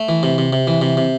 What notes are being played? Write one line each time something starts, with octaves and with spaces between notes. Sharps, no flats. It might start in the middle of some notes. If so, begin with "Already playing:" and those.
Already playing: A3
E3
C3
C3
C3
E3
C3
C3